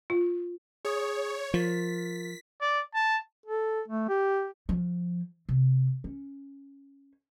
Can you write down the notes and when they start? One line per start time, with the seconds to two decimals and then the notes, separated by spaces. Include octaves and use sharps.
0.10 F4
0.85 G#4 C#5 D#6
1.54 F3 F4 A#4 A6 B6
2.61 D5
2.94 A5
3.46 A4
3.88 A3
4.09 G4
4.69 F3
5.49 C3
6.04 C#4